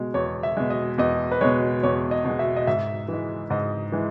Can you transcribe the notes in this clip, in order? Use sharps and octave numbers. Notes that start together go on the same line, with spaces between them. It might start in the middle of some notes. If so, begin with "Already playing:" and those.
Already playing: B2 G#3
E2 C#5
E5
B2 G#3
D#5
E2 D#5
B4
B2 G#3 C#5
E2 C#5
D#5
B2 G#3
E5
D#5
G#2 E5
E3 G#3
G#2 D#5
E3 G#3